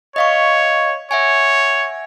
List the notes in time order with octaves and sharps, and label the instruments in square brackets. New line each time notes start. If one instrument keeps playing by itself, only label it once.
[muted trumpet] C#5 [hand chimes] D#5 F5 C#6
[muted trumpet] C#5 [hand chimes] E5 F#5 G#5